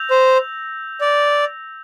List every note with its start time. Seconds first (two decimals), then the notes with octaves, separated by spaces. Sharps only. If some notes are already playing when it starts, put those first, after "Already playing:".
Already playing: E6 G6 A#6 F7
0.10 C5
1.01 D5